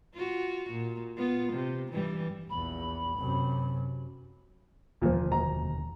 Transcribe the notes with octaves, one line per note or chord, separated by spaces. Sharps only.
F4 F#4
A#2
B3 F4
C3
G2 E3 G3
A#1 E2 B5
F#2 C3
E1 D#2 A#2 D3 F3
A#5